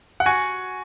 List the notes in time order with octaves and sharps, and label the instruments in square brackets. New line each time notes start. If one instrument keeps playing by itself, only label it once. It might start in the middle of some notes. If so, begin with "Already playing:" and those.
[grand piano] F#5
[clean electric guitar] F#4 [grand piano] G#5